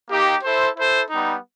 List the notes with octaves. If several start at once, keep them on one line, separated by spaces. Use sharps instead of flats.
A#3 D#4 G4
E4 A4 C5
E4 A4 C5
G3 B3 D#4